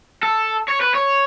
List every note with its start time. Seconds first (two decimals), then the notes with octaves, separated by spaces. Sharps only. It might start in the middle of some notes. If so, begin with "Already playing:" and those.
0.23 A4
0.69 C#5
0.82 B4
0.95 C#5